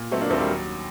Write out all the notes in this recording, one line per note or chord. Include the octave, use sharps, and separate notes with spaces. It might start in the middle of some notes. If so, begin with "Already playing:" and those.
Already playing: A#2
F#3 A3 C4
A#3 D4
D#2 A3 C4
G3 A#3
F#3